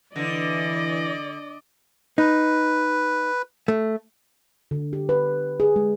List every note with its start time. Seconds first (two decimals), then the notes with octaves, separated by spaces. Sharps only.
0.16 D3 E3 D5 D#5 A#6
2.18 D#4 B4
3.68 A3
4.71 D3
4.93 G4
5.09 B4
5.60 G#4
5.76 G#3